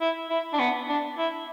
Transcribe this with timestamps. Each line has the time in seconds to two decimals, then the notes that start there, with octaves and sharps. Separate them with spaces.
0.01 E4
0.29 E4
0.53 D4
0.59 B3
0.88 D4
1.18 E4